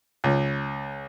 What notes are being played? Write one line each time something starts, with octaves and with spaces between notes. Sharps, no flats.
C#2